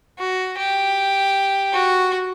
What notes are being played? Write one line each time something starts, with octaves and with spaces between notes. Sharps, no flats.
F#4
G4
F#4